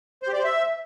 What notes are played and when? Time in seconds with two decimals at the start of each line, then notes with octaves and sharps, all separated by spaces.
0.23 C5
0.28 G4
0.33 D5
0.39 C5
0.44 E5